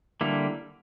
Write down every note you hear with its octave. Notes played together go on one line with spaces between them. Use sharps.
D3 G3 A#3 E4